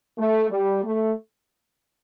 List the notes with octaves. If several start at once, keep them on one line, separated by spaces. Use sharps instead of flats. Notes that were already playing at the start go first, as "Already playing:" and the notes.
A3
G3
A3